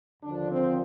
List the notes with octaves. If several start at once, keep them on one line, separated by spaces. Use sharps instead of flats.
D#2 D3 F3 D4
C4